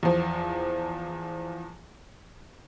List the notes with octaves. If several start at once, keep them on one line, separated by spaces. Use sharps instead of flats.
E2 F3